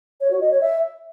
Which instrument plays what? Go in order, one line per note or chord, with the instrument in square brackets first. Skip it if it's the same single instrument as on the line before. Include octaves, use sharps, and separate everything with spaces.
[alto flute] C#5
F#4
D#5
C#5
E5